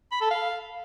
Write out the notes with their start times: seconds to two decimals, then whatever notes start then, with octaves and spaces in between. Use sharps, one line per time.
0.12 B5
0.21 A4
0.31 F5